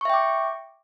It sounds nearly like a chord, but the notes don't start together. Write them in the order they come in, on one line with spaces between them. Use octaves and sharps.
C#6 E5 G5 D6